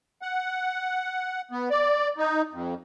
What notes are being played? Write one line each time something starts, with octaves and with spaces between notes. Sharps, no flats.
F#5
B3
D5
D#4
F2